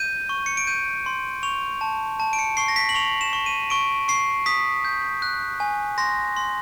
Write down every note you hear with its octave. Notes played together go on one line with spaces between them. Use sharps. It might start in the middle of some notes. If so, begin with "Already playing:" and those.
Already playing: G6 D#7
C#6
C#7
D7
G6 D#7
C6
C#6 F7
A5
A5
D7
C#7
C#6 C7
A#6
B6
F#7
C#6 F7
E7
C#6
D#7
C#6 D7
C#6 C7
D#6 B6
G6
F#6
G#5
C6 A#6
C6